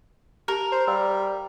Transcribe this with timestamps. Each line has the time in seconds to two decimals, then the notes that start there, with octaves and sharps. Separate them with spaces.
0.48 G4 A#4
0.72 C5
0.87 G3 F5 B5 E6